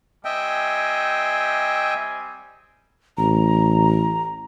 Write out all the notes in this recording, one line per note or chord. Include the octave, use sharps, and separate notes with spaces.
G3 C4 D#5 E5 G5 G#5
A1 A#5